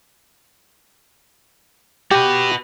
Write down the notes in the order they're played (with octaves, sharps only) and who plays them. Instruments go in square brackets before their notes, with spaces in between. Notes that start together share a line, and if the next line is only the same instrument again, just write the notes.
[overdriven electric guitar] F#4 B4 [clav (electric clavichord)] G4